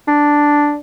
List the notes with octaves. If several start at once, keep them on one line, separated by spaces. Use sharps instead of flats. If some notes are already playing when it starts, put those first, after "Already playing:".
D4